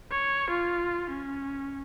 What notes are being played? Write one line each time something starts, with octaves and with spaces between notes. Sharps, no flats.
C#5
F4
C#4